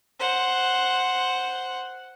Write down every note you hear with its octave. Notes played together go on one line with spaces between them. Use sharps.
C5 F#5